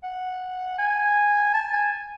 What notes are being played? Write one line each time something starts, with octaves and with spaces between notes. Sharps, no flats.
F#5
G#5
A5
G#5
G#5